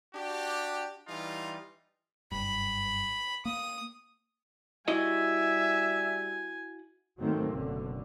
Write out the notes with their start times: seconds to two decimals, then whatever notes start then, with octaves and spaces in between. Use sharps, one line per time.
0.14 D4 F#4 G4
1.08 E3 G3 D#4 F4
2.32 F#1 G2 B5
3.45 A#3 D#6
4.88 G3 E4 F#4 D#5 E5 G#5
7.19 G#2 D#3 F#3 A3 A#3 C4
7.51 F#1 B2 D3